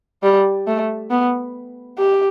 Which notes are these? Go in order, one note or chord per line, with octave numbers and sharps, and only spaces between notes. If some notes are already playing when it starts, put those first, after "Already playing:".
G3
A3
B3
G4